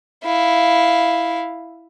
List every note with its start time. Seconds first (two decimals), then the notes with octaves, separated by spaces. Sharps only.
0.24 E4 F5